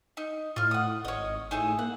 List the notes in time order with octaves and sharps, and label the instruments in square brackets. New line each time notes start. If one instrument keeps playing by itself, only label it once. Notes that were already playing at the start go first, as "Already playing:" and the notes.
[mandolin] D#4
[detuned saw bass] A2 [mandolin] F4 F6
[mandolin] F#5 D#6
[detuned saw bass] G#1 [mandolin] C#5 D#5
[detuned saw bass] A2 [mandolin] D#4 G#4 E5
[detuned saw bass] A#3 [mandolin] F#5